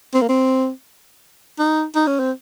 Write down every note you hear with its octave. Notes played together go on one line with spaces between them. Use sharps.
C4
A#3
C4
D#4
D#4
C#4
C4